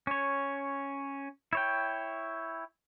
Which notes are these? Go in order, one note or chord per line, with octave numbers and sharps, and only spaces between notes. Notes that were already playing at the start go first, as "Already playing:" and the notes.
C#4 C#5
E4 C#5 G5